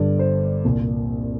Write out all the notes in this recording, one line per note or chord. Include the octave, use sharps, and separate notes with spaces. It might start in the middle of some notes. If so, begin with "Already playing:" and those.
Already playing: G1 G2 D3 D5
C5
C2 A#2